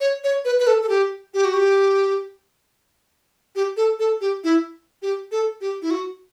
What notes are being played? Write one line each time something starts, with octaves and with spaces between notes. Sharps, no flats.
C#5
C#5
B4
B4
A4
A4
G4
G4
F#4
G4
G4
A4
A4
G4
E4
G4
A4
G4
E4
F#4